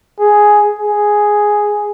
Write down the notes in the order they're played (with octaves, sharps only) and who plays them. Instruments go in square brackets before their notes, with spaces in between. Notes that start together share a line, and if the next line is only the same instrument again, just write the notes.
[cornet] G#4
G#4